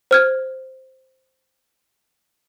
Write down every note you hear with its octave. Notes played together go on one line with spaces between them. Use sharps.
C5 F6 G#6